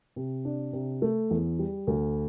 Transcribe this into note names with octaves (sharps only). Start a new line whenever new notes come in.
C3
D4
C3
A3
E2
G3
D2